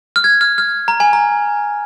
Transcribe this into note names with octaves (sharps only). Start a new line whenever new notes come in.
F6
G#6
F6
F6
A#5
G#5
A#5